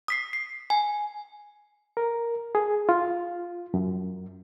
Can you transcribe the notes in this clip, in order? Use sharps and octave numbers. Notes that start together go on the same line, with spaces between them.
D#6 B6 C7
C7
G#5
A#4
G#4
F4
F#2